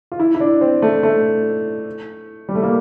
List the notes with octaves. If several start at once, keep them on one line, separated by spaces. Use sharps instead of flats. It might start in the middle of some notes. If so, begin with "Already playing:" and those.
F4
E4
E4
D4
C4
A3
A3
G3
A3
A#3